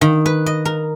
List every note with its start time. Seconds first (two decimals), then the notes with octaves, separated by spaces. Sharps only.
0.01 D#3
0.26 B4
0.46 D#5
0.65 A#4